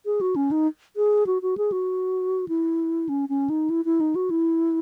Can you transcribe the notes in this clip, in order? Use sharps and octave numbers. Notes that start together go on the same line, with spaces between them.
G#4
F#4
C#4
D#4
G#4
F#4
F#4
G#4
F#4
E4
C#4
C#4
D#4
E4
E4
D#4
F#4
E4